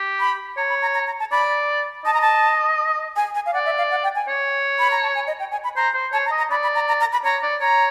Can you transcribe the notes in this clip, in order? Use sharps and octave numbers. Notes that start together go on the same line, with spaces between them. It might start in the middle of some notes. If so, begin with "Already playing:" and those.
Already playing: G4
B5
C#5 A#5
B5
A#5
A#5
A#5
A5
D5 B5
D#5 A5
A#5
A5
G#5
G#5
F5
D5 F#5
E5
F5
F#5
G5
G#5
C#5
B5
A#5
A5
G#5
D#5
G5
G#5
B5
C5 A#5
C5
C#5 A5
A#5
D#5
A#5
D5 B5
B5
A#5
A#5
A#5
B5
C#5 A#5
D5
C#5 A#5